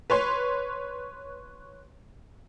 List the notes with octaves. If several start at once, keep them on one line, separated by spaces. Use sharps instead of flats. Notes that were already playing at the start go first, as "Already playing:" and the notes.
B4 C#5 C6